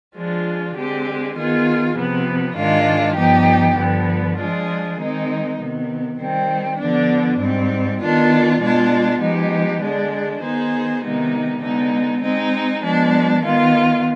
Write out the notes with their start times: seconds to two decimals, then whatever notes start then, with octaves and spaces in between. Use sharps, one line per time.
0.15 F3 G#3 D4 F4
0.75 D3 G#3 C4 G4
1.35 D#3 B3 F4 G#4
1.96 C3 F3 B3
2.56 G#2 D#3 G#3 D4 F4
3.16 G2 F3 B3 D#4 G4
3.77 G2 D3 F3 B3
4.38 F3 G#3 D4 F4 G#4
4.97 D#3 G#3 C4 D#4
5.58 C3 D#3 B3
6.18 D#3 G3 C4
6.79 D3 F3 B3 D4
7.39 G#2 G3 C4
8.00 D#3 B3 D4 F4
8.60 B2 G#3 D4 F4
9.20 F3 G#3 B3 D#4 G4
9.81 D3 G#3 D4 G#4
10.41 D#3 B3 D#4 G#4 C5
11.02 C3 D#3 G#3 B3 D#4
11.62 D3 G#3 B3 D#4
12.22 G#3 C4 D#4
12.82 F3 G#3 B3 D4
13.42 D#3 B3 F4